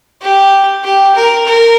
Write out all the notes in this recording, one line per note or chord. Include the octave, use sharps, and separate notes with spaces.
G4
G4
A#4
A#4